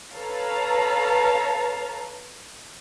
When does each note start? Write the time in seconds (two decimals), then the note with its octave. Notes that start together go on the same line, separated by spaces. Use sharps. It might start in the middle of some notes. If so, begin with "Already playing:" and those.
0.16 A4 B4 C#5 F5 A5 A#5